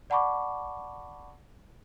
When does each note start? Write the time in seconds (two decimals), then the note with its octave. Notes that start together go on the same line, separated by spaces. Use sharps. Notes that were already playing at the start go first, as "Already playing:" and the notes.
0.10 D5 F#5 A5 B5 C#6 D6